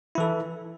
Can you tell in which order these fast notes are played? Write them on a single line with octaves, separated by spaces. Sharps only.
E4 E3 A4